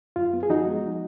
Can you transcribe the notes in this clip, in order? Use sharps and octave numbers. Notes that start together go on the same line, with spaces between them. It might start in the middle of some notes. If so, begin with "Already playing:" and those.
F#2 F4
B3
G#4
F3 D#4 F#4
G#3